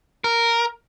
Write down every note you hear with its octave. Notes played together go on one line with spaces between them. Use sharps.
A#4